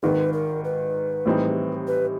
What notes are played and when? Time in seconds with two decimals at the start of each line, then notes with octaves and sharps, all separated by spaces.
0.03 G#1 G#2 D#3 B4
0.33 A#4
0.64 B4
1.25 A2 E3 G3 C4 D#4
1.87 B4